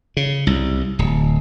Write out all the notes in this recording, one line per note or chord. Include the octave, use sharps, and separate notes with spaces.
C#3
C2
D1